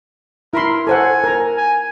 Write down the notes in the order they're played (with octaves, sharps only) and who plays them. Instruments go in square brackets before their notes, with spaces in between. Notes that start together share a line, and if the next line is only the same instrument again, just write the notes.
[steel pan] E4 B5 C6 [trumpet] A#4
[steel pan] A4 C5 F#5 [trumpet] G#5
[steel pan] A#4 A#5
[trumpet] G#5